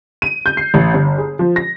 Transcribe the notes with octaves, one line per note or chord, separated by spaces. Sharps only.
D#7
G6
C7
A1
G1
G#4
F3
A#6